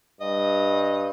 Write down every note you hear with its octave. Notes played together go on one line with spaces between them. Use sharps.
G2 D#5